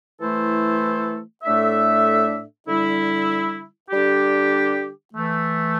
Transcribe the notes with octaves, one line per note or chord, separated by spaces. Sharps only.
E3 A3 E4 A4 C5
A2 A3 D4 A4 E5
D3 G3 E4
D3 G3 D4 G4
E3 A3